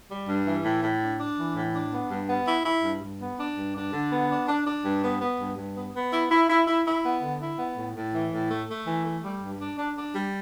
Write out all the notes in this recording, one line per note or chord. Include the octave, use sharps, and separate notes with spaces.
G3
G2
E3
A2
A2
D4
D4
E3
A2
D4
B3
G2
B3
E4
E4
G2
G2
B3
D4
G2
D4
D3
B3
D4
D4
D4
G2
B3
B3
G2
G2
B3
B3
E4
E4
E4
E4
E4
B3
D3
E4
B3
A2
A2
E3
A2
A3
A3
E3
A3
G3
G2
D4
D4
D4
G3